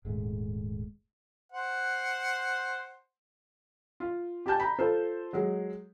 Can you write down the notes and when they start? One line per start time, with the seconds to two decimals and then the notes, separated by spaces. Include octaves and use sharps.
0.05 D#1 G#2 G#3 A3
1.52 C5 F#5
4.00 F4
4.46 G4 G#5 A5 G6
4.60 A#5 B5
4.79 F4 A4 C5
5.33 F#3 G#3